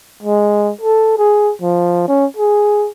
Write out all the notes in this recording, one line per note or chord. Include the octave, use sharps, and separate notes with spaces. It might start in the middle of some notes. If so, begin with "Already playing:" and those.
G#3
A4
G#4
F3
C#4
G#4